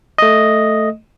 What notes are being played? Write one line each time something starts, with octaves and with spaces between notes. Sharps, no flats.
A3 D#5